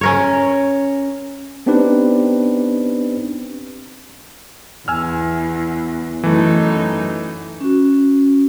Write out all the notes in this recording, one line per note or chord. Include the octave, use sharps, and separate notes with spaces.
C#4 A#4 C#5
B3 C4 D4 D#4 G4 B4
E2 G#5 E6 F6
F#2 E3 A3 D#4
C#4 F#4